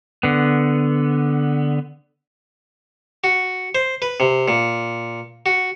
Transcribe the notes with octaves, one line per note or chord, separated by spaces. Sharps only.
D3 B3
F#4
C5
B4
C3
A#2
F#4